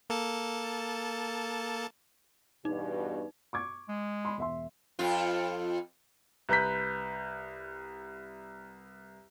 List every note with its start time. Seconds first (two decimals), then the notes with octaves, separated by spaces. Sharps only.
0.10 A#3 A4 A5
2.65 E2 G2 B2 D#4
3.53 C#6 D6 G#6
3.89 G#3
4.25 B5 C6
4.38 E1 E5 C6
4.99 F2 F4
6.49 C2 B4 A#5 G6 B6